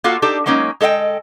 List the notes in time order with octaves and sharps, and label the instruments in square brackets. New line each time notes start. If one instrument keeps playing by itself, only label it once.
[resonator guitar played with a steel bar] A#3 F4 F#4 A4 F5
D4 D#4 G4 A4
F#3 G#3 A#3 C#4 D#4
G#3 A4 D#5 F5 G5